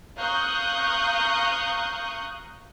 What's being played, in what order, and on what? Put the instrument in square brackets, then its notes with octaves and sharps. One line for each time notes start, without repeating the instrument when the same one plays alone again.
[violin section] F5 A#5 C#6 D#6 F#6 G6